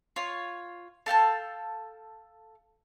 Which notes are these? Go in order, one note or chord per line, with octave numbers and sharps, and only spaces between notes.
F4 C#5
A4 F5 G5 A5